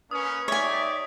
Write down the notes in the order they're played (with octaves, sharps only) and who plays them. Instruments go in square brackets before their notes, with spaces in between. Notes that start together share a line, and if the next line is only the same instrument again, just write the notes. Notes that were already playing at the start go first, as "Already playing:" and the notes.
[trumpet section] A#3 C#4 [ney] B4 [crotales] D#6
[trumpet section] D#4 G4 D5 [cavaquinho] C#5 G#5 [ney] E5